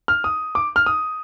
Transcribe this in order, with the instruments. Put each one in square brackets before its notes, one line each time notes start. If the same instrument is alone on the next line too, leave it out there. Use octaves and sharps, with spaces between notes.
[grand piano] F6
D#6
D6
F6
D#6